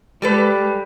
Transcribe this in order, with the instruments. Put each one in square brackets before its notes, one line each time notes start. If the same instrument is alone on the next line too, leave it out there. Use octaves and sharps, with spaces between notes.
[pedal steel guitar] G3 [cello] G#3 [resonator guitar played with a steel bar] G4 A4 B4